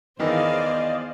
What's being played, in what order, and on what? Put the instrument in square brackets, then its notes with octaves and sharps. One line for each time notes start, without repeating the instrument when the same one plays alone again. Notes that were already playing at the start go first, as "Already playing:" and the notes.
[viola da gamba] E2 G#4 [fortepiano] D#3 E3 [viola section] C5 D5 F5 [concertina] D#5